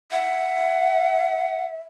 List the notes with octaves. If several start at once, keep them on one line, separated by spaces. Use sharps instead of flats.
E5 F#5